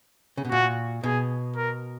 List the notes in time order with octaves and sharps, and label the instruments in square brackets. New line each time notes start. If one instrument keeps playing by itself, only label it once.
[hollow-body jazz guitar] C#3
B2
[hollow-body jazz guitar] A#2 [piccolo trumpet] F#4
[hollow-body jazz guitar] B2 [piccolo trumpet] G#4
[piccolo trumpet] A#4